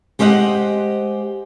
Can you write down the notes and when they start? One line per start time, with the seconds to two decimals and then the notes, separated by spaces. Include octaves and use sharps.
0.19 G#3 G4 C5 D#5 F5 F#5